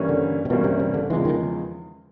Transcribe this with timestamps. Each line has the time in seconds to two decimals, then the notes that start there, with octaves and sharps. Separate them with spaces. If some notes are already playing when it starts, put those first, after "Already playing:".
Already playing: G2 E3 G3 A#3 C#4
0.09 D3
0.45 C3
0.50 G2 B2 E3 G3 A#3 C#4
0.64 C3
0.80 C3
0.94 D3
1.10 E2 C#3 E3 F3 G#3
1.25 D#3